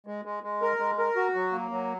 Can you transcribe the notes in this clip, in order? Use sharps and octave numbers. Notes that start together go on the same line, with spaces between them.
G#3
G#3
G#3
A#4
G#3
A#4
F#4
F#3
A#3
F#3